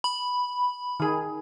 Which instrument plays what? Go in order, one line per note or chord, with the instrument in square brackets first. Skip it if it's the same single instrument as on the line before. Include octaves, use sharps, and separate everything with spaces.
[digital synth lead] B5
[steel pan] D#3 G#4